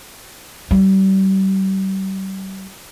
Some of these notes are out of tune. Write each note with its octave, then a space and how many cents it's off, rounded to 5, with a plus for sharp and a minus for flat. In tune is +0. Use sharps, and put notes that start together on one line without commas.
G3 -35 D#4 +0